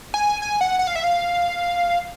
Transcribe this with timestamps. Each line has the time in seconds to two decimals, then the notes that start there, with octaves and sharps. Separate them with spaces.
0.14 G#5
0.42 G#5
0.61 F#5
0.79 F#5
0.87 F5
0.96 E5
1.04 F5